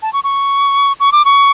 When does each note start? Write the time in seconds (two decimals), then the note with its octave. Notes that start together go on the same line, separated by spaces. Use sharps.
0.02 A5
0.13 C#6
0.24 C#6
1.00 C#6
1.12 D6
1.25 C#6